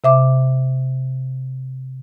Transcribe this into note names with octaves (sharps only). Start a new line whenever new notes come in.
C3 E5 D6